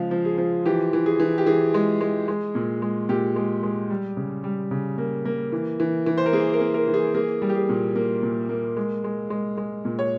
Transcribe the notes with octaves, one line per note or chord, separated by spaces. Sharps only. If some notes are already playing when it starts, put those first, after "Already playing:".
Already playing: C#3 F3 G#3 F5
F3
G#4
F3
E3 G4
E3
G#4
E3
G4
E3 G#4
G#3
G#3
G#3
A#2
G#3
A#2 G4
G#3
G#3
G3
C#3
G3
C#3
A#3
A#3
E3
E3
E3
C5
A#4
A#3 G#4
A#4
A#3
A#4
E3
G#4
A#3 G#4
G3
G4
G#4
A#2
A#3
A#2
A#3
G#3
G#3
G#3
G#3
A#2
C#5